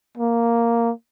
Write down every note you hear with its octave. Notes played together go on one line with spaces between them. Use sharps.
A#3